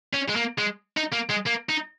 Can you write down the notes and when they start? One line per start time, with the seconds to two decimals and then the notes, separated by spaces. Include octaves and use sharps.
0.13 C#4
0.28 G#3
0.36 A#3
0.58 G#3
0.97 D#4
1.13 A#3
1.30 G#3
1.46 A#3
1.69 D#4